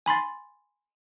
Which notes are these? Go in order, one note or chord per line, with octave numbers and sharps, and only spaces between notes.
G#5 B5 C6 A6